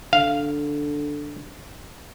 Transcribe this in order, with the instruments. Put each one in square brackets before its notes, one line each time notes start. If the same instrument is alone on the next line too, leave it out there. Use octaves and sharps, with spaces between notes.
[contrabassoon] D3 [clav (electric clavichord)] F5